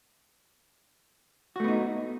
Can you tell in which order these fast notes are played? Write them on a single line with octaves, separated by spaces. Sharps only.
F#4 A3 B3 D#4